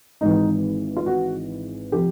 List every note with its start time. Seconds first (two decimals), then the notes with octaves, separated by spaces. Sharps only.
0.21 G#1 G#2 E3 D#4
0.97 F4
1.06 F#4
1.92 C3 F3 G4